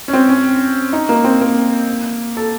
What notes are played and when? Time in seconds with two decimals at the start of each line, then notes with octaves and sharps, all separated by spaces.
0.08 C#4
0.13 C4
0.29 C#4
0.93 D#4
1.09 A#3
1.24 C4
1.41 A#3
2.37 A4